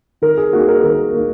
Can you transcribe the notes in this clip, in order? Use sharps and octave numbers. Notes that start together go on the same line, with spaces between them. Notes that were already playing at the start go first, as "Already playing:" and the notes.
D#3 A#4
G#4
A#3 D#4 F#4
G#4
A#4
D#3 A#4
A#3 D#4